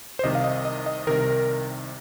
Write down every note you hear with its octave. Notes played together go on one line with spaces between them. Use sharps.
C5
C2 C3 D#3 D#5
F5
D#5
D#5
D#5
C2 C3 D#3 A#4